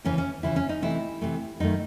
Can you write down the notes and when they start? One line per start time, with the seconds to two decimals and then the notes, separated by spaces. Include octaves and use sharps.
0.04 D#2 C#3 E3 C#4
0.18 C#4
0.43 D#2 C#3 E3 E4
0.56 C#4
0.69 D#4
0.82 C3 E3 A3 E4
1.21 C3 E3 A3
1.60 F#2 D#3 A3 D#4